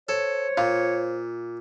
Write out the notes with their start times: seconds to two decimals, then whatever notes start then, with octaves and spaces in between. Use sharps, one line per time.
0.09 A4 C5 C#5
0.57 A#2 F4